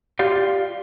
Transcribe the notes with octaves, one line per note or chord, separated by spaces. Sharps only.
F4 G4 D5 F5